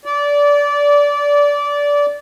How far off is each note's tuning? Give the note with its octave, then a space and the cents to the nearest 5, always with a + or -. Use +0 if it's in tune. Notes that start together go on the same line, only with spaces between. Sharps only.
D5 -20